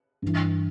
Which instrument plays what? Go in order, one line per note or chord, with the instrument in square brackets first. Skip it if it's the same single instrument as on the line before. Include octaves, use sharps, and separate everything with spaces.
[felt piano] G2 E3